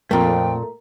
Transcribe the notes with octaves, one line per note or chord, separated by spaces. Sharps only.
F2 A#2 A3 A#4 G5 A#5